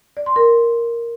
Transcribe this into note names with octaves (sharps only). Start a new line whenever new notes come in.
D5
C6
A#4